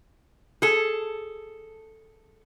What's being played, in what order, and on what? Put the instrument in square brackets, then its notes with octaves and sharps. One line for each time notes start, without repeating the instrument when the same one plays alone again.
[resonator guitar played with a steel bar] G#4 A4